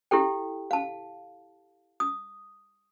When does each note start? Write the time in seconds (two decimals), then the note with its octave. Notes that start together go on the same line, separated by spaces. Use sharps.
0.11 E4 G4 A4 G5
0.71 F5 A5
2.00 D#6